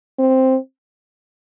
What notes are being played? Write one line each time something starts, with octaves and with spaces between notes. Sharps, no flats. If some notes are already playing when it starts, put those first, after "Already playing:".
C4